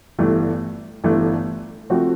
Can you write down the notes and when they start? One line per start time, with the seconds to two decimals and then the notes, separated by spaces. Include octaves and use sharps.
0.18 G1 G2 E3 A3
1.04 G1 G2 E3 A3
1.90 F3 A3 C4 F#4